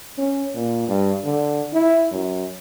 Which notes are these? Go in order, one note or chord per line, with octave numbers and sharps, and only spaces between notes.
C#4
A#2
G2
D3
E4
F#2